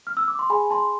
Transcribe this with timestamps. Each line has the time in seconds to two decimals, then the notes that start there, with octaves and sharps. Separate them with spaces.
0.07 F6
0.17 E6
0.28 D6
0.39 C6
0.50 G#4 G#5 B5
0.70 A5 C6